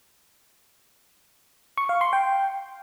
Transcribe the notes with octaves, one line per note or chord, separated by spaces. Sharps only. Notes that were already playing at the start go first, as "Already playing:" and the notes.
C#6
F5
C6
G5